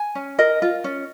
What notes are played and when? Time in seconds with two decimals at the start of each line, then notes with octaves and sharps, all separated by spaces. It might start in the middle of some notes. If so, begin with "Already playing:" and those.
Already playing: G#5
0.15 C#4
0.39 A#4 D#5
0.62 F4
0.84 C#4